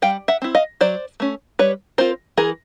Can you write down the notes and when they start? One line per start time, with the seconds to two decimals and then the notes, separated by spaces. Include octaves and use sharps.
0.02 G3 F5 G5
0.28 E5 F#5
0.42 C4 E4
0.55 D#5 F5
0.81 F#3 C5 D5
1.20 A3 C#4
1.59 G3 B4 C#5
1.98 C4 F4 A#4 C5
2.37 E3 G#4 A#4